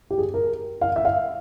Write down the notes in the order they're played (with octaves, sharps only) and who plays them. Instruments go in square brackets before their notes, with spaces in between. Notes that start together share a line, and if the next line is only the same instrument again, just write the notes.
[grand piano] G4
G#4
A#4
F5
E5
F5